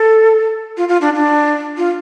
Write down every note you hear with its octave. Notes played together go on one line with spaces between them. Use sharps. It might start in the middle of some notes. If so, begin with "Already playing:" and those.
Already playing: A4
F4
F4
D4
D4
F4